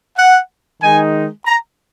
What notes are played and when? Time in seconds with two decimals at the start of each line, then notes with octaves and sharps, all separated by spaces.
0.17 F#5
0.81 D#3 G#3 D#4 G#5
1.46 A#5